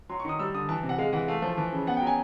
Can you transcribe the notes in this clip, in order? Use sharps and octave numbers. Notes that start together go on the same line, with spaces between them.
F#3 C6
C#6
D#3 D#6
G3 E6
D3 D#6
E3 A5
C3
F#5
G#3 F5
E3 F#5
A3 F5
F3
E3
C#3
B3 F#5
G5
F#3
G#5